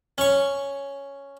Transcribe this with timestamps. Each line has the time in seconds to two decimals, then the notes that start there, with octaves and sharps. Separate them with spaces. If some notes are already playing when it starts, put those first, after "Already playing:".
0.18 C#4 C#6